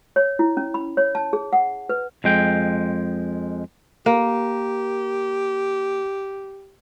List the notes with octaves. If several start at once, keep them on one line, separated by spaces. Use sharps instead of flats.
C#5
E4
C#4
B5
C#5
A5
G#4
F#5
B4
F2 G#3 G5
A#3 G4